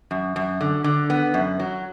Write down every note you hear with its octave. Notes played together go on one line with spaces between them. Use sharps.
F#2
F#2
D3
D3
B3
F#2
F#3